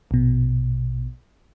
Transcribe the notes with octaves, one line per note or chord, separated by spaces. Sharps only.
A#1 B2